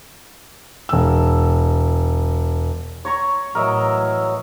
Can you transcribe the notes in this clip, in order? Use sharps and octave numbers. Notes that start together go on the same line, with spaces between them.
E1 E6
C#5 A#5 C#6
A2 E3 F#3 A#4 D#5 E5